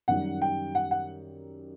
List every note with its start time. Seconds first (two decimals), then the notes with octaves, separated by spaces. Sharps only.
0.08 F#2 D#3 G3 F#5
0.42 G5
0.75 F#5
0.91 F#5